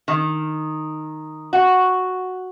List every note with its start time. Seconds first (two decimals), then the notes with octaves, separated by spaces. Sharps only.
0.08 D#3
1.53 F#4